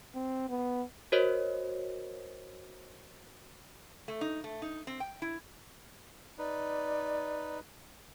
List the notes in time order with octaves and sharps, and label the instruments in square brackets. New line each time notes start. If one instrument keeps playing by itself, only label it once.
[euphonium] C4
B3
[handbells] F#4 A#4 C5 C#5 D#5
[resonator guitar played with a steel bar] A3
D#4
A3
D#4
C4
G5
E4
[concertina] D#4 B4 [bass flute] D5